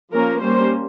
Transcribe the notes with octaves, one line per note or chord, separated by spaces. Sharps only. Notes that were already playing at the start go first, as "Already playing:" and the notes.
F3 A#3 C#4 A#4
G3 A#3 C#4 C5